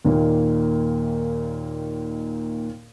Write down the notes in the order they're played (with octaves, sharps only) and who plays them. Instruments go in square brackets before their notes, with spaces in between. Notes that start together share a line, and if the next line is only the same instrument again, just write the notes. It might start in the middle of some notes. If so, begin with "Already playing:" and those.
[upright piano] D#2 A#2 D#3 A#3